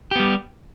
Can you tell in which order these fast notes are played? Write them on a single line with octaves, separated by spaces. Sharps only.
G4 B3 G3